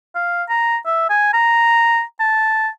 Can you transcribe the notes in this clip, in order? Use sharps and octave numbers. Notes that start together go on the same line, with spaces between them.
F5
A#5
E5
G#5
A#5
A5